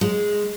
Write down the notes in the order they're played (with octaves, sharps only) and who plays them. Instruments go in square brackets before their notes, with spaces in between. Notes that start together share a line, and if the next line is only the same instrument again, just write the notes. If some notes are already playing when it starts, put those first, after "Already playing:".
[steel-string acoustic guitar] G#3